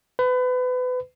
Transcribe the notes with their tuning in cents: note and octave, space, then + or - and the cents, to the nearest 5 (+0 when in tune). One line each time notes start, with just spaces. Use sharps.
B4 +30